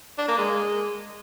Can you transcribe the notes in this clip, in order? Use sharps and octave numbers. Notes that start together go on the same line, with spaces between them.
D4
A#3
G#3